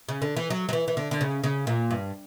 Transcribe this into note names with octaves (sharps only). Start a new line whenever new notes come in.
C#3
D3
E3
F#3
F#3
E3
E3
D3
D3
C#3
C#3
A#2
G2